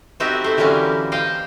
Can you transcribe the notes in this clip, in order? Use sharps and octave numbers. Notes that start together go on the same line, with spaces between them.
B3 C4 D#4 F#4 G4 E5
A3 C5
D3 E3 F#3 G3 A#3 C#4
C5 D#5 F5 G5